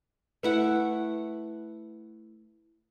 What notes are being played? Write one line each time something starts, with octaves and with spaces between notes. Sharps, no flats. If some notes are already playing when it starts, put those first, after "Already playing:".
A3 E4 B4 F#5